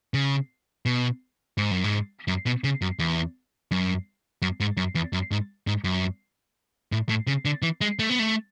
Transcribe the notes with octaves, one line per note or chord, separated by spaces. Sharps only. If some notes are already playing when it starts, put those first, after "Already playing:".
C#3
B2
G#2
F#2
G#2
F#2
B2
C#3
F#2
E2
F#2
F#2
G#2
F#2
E2
F#2
G#2
G#2
F#2
A2
A2
C#3
D3
E3
G#3
A3
B3
A3